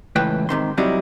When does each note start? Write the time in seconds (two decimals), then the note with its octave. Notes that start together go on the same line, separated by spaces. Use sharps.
0.16 C#2 A2 E3 B4 G5
0.49 G#2 C3 D#3 C6
0.77 C3 F#3 G3 C4 D#4 E4